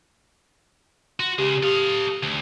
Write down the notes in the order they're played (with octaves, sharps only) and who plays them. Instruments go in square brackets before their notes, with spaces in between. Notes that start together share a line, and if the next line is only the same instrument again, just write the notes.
[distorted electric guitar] F#4 [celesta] C6
[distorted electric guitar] C#2 C#3 [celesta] G4
[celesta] G4 D#6 [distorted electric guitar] A4 F5
[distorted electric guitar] D2